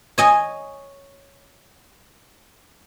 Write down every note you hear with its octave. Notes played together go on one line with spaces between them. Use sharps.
C#5 D#5 G#5